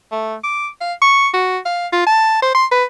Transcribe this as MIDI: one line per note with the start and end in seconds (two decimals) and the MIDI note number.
0.12 0.35 57
0.44 0.68 86
0.81 0.93 77
1.02 1.28 85
1.34 1.58 66
1.65 1.87 77
1.92 2.06 65
2.07 2.38 81
2.42 2.52 72
2.55 2.66 84
2.72 2.84 71